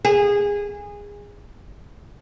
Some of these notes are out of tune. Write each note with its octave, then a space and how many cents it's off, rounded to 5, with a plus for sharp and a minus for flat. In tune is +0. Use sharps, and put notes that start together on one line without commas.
G#4 -20